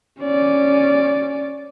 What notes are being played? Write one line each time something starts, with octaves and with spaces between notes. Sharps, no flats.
C#4 D5